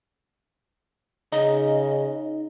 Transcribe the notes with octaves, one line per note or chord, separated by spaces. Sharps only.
C#3 D#4 D#5